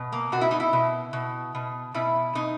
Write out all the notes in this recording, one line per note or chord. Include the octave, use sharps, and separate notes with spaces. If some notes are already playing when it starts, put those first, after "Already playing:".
Already playing: B2
A#3
B2 F#4
E4
D#4
E4
B2
B2
B2
B2 E4
B2 D#4